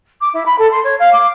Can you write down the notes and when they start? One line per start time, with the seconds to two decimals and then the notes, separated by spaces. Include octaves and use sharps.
0.21 D6
0.33 E4
0.45 B5
0.58 A4
0.71 C6
0.84 C#5
0.99 F5
1.12 D6